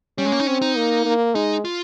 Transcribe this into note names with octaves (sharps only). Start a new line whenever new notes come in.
G3 C#4
G#3
A#3
D#4
C4 C#4
D#4
A#3
A#3
G#3 D#4
F4